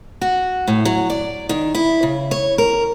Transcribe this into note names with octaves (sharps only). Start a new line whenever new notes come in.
F#4
A2
F#3
D5
D#3
E4
C#3
C#5
A#4